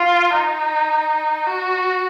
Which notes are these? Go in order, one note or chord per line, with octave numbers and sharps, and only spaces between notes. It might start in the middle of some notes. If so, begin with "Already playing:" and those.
Already playing: F4
D#4
F#4